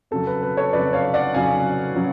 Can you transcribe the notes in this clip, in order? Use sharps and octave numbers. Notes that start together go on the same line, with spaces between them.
F2 C#3 F#3 A4
B4
B4
A4 C#5
F2 C#3 F#3 B4 D5
C#5 F5
D5 F#5
F2 C#3 F#3 F5 G#5
C#3 F#3